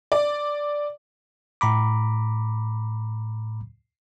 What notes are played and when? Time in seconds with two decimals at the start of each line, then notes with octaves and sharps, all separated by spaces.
0.12 D5
1.61 A2 A#5 B5 D6